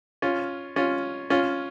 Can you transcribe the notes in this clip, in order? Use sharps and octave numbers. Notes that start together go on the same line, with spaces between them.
C#4 F4
C#4 F4
C#4 F4